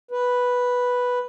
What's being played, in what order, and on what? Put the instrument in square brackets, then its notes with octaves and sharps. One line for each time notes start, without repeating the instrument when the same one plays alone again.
[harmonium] B4